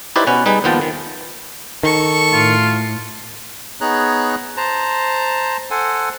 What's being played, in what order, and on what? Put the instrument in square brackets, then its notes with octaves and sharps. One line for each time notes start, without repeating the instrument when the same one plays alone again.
[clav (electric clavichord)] D#4 E4 G4 B4 C5 D5
B2 C#4 B4 F#5
G3 D#4 G#4 B4
D#2 F3 B3 F4 G5 A5
D#3
[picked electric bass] D#3 [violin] A4 C#6
[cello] A2 [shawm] F4
[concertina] B3 D#4 G#4 C#5 A#5 F#6
C5 A5 A#5
A4 C5 F#5 G#5